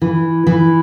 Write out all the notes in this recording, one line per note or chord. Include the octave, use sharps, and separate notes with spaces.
E3
E3